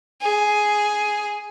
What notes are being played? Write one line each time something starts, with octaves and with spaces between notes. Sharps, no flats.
G#4